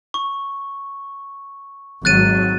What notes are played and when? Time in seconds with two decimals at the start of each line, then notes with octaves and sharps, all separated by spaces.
0.14 C#6
2.05 G#1 F#3 F#6 A6 D#7